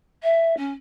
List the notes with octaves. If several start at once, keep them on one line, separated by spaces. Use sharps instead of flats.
E5
C#4